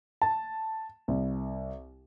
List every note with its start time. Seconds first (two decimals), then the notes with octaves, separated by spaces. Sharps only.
0.22 A5
1.08 C2